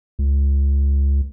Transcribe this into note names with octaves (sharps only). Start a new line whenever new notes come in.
C#2